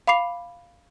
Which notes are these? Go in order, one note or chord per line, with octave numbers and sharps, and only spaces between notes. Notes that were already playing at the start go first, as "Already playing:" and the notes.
F5 B5 D6 C7 F7